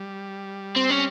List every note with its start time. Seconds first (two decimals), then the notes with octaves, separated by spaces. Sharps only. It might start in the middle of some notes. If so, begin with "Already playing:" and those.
Already playing: G3
0.76 C4
0.90 C#4